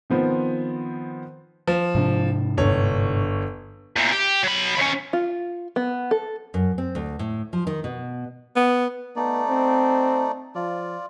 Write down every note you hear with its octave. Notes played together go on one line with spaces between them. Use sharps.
D#3 F3 B3 C4
F3
G#2 C3 D4
G1 C#5
E2 A#2
G4
F#3 B5
D#2 C#4
F4
B3
A4
F#2
C4
D2
A2
F3
D#3
B2
B3
A3 B3 D#4 D5
C4
F3 F4 D5